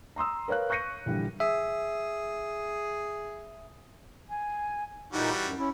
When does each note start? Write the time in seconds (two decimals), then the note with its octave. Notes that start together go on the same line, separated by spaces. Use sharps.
0.16 A#5 C6 D#6 E6
0.48 A#4 B4 C#5 F5 F#6
0.70 C#6 F#6 G6 A#6 C#7 D#7
1.06 A#1 D3 E3 G3
1.40 G#4 E5
4.27 G#5
5.13 A#2 E3 G3 D#4 F#4
5.41 F#2
5.58 C#4 E4